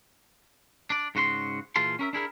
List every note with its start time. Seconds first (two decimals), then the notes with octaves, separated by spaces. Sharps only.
0.90 D4 D5
1.15 G#2 C#3 F#4 B4 C6
1.76 A#2 E3 G#4 F5 A5 C6
1.99 C#4 A#4 E5
2.13 D4 E4 G#4 A#4